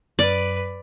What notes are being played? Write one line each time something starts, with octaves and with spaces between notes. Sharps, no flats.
F#2 B4 D5